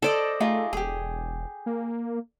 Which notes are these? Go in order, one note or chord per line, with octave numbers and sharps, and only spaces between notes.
A4 C5 D5 D#5
A3 D#4 F4 G#4
E1 G4 G#4
A#3